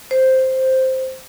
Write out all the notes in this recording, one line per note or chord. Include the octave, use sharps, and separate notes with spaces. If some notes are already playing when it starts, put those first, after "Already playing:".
C5